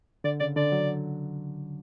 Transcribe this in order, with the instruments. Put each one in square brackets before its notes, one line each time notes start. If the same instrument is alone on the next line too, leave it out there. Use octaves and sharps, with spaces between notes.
[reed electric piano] D3 [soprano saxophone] D5
[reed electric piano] C#3 [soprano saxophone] D5
[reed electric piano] D3 [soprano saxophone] D5
[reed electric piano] F#3